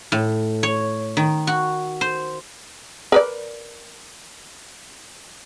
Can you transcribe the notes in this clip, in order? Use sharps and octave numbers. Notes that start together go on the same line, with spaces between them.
A2
C#5
D#3
F#4
C5
A#4 B4 D5